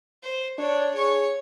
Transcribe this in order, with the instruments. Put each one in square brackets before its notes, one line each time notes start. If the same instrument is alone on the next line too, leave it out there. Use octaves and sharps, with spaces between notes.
[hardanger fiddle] C5
[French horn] D4 [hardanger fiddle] C#5
[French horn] G#4 [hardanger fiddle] C#5 C#6